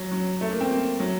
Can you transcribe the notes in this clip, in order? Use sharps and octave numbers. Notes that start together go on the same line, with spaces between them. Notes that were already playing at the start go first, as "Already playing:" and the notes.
Already playing: F#3
F#3
A3
A#3
C4
A#3
F#3